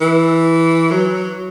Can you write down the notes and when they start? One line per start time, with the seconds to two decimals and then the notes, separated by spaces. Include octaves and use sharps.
0.01 E3
0.91 F#3